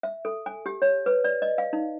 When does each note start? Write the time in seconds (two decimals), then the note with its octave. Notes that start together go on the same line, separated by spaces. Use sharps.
0.03 E5
0.25 A4
0.46 G#5
0.66 G4
0.82 C#5
1.06 B4
1.24 D5
1.42 D#5
1.58 F5
1.73 D#4